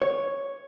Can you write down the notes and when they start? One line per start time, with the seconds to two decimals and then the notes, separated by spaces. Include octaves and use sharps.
0.02 C#5